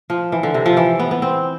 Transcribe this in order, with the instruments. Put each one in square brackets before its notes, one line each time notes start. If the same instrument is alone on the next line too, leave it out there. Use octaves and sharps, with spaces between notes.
[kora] F3
E3
D3
C3
F3
E3
B3
B3
C4